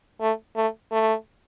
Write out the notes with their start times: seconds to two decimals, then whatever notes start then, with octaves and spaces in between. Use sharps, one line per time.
0.20 A3
0.56 A3
0.92 A3